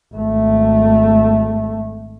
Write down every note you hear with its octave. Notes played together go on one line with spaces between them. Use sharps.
G#1 A3